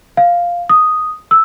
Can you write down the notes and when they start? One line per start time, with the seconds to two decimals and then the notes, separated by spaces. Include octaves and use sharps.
0.17 F5
0.69 D#6
1.31 E6